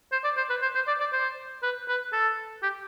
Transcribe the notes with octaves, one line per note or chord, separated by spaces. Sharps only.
C5
D5
C5
B4
C5
C5
D5
D5
C5
B4
B4
A4
G4